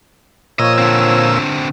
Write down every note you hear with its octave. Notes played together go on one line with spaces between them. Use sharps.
A#2 F3 C#5 D#5 E6
D3 C4